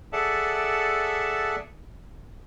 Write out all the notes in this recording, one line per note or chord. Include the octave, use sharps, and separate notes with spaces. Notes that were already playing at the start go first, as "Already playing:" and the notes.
G#4 A4 D5 E5 F#5 A5